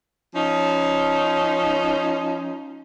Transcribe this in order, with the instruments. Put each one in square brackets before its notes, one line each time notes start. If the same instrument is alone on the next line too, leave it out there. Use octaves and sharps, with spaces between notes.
[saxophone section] F3 C#4 D#4